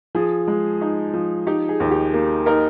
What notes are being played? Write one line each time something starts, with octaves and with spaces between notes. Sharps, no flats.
F3 G#4
G#3
D#4
F3
D#4 G4
G#4
D#2
G4
A#3
D#4 A#4